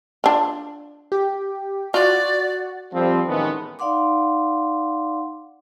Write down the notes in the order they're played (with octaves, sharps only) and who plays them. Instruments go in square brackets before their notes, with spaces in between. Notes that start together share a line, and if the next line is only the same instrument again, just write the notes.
[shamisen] D4 F4
[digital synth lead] G4
[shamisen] F4 [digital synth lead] F#4 [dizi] D5
[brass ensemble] F2 F3 G3 C4
A1 D#3 E3 G#3 A3 B3
[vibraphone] D#4 D5 F5 F#5 C6 D6